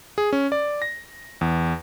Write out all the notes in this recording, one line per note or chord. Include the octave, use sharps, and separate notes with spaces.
G#4
C#4
D5
A#6
E2